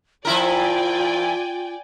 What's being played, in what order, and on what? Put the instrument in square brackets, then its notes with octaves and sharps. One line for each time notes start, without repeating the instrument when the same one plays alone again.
[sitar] F3 E4 A#4 [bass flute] F4 [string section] D5 G5 G#5